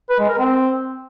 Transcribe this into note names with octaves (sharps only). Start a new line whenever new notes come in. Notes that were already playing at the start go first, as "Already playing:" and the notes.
B4
G#3
A#4
C4